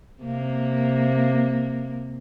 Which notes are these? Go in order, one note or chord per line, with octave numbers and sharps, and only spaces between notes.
C3 A#3